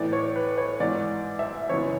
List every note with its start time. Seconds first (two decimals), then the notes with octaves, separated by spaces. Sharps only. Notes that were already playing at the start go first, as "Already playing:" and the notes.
Already playing: A2 E3 D5
0.13 C#5
0.36 B4
0.58 C#5
0.80 G#2 E3 D5
1.39 E5
1.69 F#2 C#3 E3 C#5